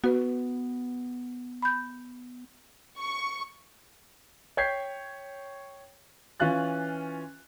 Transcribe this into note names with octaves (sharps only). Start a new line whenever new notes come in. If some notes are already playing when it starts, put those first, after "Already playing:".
B3 F#4 B4
B5 G6
C#6
C#5 G5 G6 G#6 B6 C7
E3 C#4 F4 F5 F#6 A6